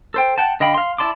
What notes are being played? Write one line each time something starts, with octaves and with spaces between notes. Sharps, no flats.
A4 C5 G5
F#5 G5 A5
D3 D#5 F5 G5 B5
F5 C6
E4 D5 A5 C6 D6